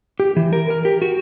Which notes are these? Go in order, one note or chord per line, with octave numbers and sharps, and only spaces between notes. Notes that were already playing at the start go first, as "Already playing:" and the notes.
G4
E3
A#4
A#4
G4
F#4